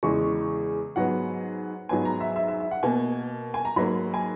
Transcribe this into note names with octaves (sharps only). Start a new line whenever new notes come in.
E2 C#3 G#3 C#6
G#2 F#3 B3 F#5
G#2 F#3 B3 G#5
A#5
E5
E5
E5
E5
F#5
B2 A#3 G#5
G#5
A#5
G#2 F#3 A#3 B5
G#5